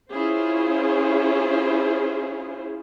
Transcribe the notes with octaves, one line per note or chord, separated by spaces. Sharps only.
C#4 E4 F4 G#4 C5